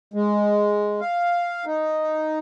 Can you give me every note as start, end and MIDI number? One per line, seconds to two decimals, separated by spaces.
0.14 1.00 56
1.01 1.65 77
1.66 2.39 63